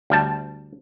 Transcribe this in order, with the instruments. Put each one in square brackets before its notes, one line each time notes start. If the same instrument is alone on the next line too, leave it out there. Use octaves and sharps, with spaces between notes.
[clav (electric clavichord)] D2 G3 A5